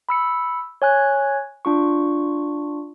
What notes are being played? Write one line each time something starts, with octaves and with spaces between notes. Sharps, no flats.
B5 E6 C#7
C#5 G#5 F#6 G#6
D4 F4 C#6